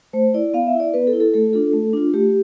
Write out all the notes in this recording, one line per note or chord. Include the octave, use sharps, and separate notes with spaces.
A3 C5
E4 D5
B3 F5
E5
E4
D5
B3 B4
A4
E4
A4
A3 A4
D4 F4 A4
A3
D4 F4
A3 G4